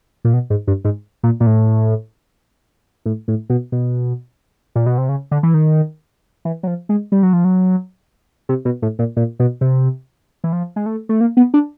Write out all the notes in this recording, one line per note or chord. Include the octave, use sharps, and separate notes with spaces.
A#2
B2
G#2
G2
G#2
A#2
A#2
A2
A2
A2
B2
B2
A#2
B2
C3
C#3
D3
E3
D#3
E3
F#3
F3
G#3
G3
F#3
F3
F#3
C3
B2
A2
A#2
A#2
B2
C3
E3
F3
G#3
A3
A3
A#3
B3
D4